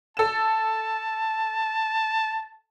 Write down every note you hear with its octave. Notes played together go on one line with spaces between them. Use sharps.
A4 A5 E7